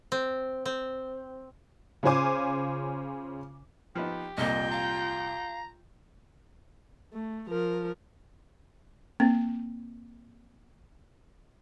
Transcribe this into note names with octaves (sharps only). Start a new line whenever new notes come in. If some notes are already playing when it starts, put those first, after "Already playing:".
C4
C4
C#3 C#4 F4 C5 G#5 D6
F3 B3 D#4 G4
C2 F2 A#2 F4 D#5 G5
F5 A#5
A3
F3 A#4
A#3 C4